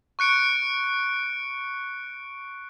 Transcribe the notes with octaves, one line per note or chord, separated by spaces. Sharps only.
C#6 F#6 C#7 D7